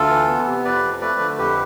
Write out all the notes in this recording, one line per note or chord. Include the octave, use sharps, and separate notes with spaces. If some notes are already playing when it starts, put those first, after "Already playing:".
Already playing: D2 F4 A4
E3
B3
C3
F2 B4 D5
F3
A3 B4 D5
D3
F2 G4 B4